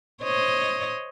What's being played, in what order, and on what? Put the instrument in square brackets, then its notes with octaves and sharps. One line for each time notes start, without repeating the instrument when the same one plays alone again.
[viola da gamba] C5 C#5 D#5